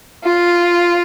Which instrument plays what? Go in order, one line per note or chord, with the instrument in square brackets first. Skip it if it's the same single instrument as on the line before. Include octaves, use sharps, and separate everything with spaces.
[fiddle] F4